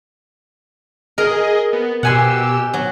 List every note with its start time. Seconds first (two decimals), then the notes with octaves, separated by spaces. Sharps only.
1.18 G#4 A#4 D#5
1.73 B3
2.03 B2 G4 F#5 G#5 C6 E6
2.74 F#3